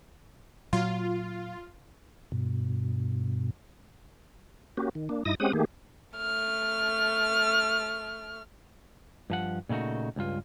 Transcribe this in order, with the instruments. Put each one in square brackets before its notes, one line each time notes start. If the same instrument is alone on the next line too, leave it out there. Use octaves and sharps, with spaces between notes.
[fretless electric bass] A#2 F#3 [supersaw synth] F4
[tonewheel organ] G2 B2
A#3 C#4 F#4 G4
D#3
A#3 D4
G2 D#4 E4 D#6 A#6
G#3 C4 C#4 G4 F#5 D#6
D#3 A3 A#3 G4 G#4
[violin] A3 F6
[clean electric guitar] G2 F3 F#5
A#2 C#3 A3 D#4 F#4
C#2 G2 F4